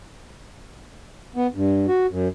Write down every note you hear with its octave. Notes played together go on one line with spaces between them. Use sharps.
B3
G2
F#4
F#2